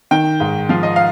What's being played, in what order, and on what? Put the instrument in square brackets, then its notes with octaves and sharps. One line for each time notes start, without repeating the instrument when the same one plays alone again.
[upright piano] D#3 G5
G#2
F3 F5
D#5
F5